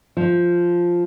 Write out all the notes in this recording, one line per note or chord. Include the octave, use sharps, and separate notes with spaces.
F3